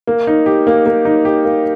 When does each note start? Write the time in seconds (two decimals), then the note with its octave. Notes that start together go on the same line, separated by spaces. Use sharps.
0.07 A#3
0.27 D#4
0.46 G4
0.67 A#3
0.86 A#3
1.05 D#4
1.25 G4
1.45 A#3